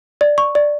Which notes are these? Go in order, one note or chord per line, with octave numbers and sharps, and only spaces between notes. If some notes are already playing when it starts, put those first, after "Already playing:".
D5
C#6
D5